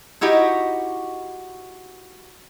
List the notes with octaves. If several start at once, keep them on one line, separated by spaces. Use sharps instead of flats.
D#4 E4 F#4 G4 D#5